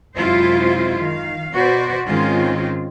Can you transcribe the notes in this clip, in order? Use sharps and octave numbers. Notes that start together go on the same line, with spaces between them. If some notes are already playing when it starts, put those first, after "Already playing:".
F#2 C3 G#3 E4 F4 C5
D#3 F5
B2 F#4 B4 C5 D5
G#2 D#3 G#3 C4 C#4 F4